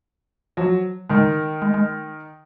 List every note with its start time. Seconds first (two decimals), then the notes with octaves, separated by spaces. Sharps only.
0.57 F3 F#3
1.10 D#3 G#3
1.62 G#3
1.74 G#3